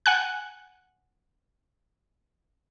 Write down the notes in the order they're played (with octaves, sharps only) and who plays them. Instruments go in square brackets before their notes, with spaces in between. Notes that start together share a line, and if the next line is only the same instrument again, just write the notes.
[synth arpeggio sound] F#5 G#5 F#6